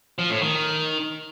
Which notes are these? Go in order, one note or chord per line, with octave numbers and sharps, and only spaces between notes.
F3
A2
D#3